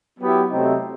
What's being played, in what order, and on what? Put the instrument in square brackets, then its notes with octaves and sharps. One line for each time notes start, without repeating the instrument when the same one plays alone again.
[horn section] F#3 B3 E4 G4
C3 F#3 A3 C4 D#4